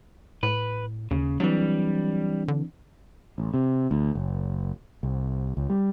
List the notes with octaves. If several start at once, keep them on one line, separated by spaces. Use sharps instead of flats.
A2 B4
D#2 C#3
E3 F#3 G3 C4 D4
D3
A1
C3
D2
F#1
C2
C#2
G3